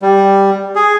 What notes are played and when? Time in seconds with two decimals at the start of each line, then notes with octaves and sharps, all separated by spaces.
0.02 G3
0.75 G#4